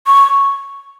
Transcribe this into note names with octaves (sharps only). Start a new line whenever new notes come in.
C#6